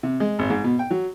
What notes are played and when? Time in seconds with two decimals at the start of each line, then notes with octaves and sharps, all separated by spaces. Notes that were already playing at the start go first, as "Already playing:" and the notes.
0.03 C3
0.20 G#3
0.39 G#1
0.50 G#2
0.64 B2
0.79 G5
0.91 F#3